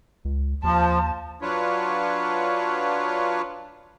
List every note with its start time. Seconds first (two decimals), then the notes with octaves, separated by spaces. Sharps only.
0.25 C#2
0.63 D#2 F3 A5
1.42 F#3 D4 F4 B4 C#5